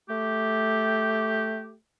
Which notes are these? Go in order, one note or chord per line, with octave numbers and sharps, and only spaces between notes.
A3 G4